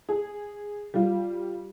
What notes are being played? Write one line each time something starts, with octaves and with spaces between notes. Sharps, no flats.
G#4
G3 F4